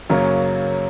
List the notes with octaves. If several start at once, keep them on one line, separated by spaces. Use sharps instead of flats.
F#2 C#3 F#3 A#3 C#4